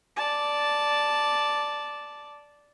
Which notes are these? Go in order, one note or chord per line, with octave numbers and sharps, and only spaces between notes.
D5 A5